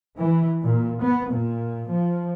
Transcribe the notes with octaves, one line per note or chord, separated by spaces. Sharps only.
E3
A#2
B3
A#2
F3